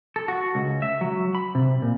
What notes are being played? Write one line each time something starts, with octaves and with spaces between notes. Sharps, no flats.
A4
F#4
C#2
E5
F#3
B5
C3
A#2